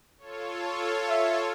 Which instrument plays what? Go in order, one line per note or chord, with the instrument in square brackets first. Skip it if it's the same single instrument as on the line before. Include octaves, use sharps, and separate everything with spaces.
[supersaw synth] F4 A4 C#5
[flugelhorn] E5